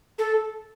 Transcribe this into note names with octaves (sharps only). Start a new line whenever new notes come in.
A4